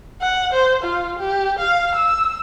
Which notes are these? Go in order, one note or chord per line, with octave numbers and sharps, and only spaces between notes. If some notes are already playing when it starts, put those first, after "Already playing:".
F#5
C5
F4
G4
F5
E6